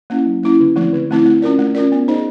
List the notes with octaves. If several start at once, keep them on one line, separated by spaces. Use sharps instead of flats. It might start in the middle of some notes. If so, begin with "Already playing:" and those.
A#3 C#4 E4
F#3
A#3 C#4 E4
D3
F3 A3 C4 E4
D3
F3 A3 C4 E4
A3
C#4 F4 A#4 D5
A3
C#4 F4 A#4 D5
B3
D#4 G#4 C5 D#5